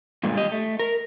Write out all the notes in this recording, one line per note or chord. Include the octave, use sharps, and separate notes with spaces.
G2 A#2 D3 G#3
G4 D#5
A3
A#4